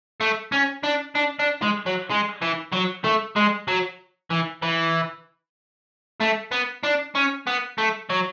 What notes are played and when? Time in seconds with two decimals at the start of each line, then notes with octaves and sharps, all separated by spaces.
0.21 A3
0.52 C#4
0.84 D4
1.15 D4
1.39 D4
1.62 G#3
1.86 F#3
2.10 G#3
2.42 E3
2.72 F#3
3.04 A3
3.36 G#3
3.68 F#3
4.30 E3
4.62 E3
6.21 A3
6.52 B3
6.83 D4
7.15 C#4
7.47 B3
7.78 A3
8.10 F#3